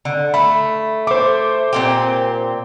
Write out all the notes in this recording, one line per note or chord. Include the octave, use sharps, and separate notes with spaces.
D3
A3 B5
A3 C5 D6
A#2 C4 G4